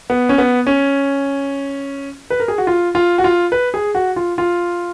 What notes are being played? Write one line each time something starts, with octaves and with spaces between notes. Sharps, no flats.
B3
C#4
B3
C#4
B4
A#4
G#4
F#4
F4
F4
F#4
F4
B4
G#4
F#4
F4
F4